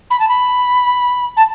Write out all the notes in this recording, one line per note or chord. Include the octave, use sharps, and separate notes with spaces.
B5
A5
B5
A5